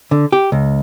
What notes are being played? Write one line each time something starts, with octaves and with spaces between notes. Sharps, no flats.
D3
G4
C#2